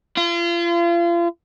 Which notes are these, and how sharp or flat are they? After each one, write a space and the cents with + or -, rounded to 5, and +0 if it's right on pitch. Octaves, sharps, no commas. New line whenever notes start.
F4 -35